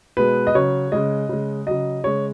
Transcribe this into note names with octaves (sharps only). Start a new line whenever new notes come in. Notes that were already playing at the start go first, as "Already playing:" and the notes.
B2 G#3 B4
D#5
C#3 F#3 C#5
C#3 G#3 D#5
C#3 G#3
C#3 F#3 D#5
C#3 G#3 C#5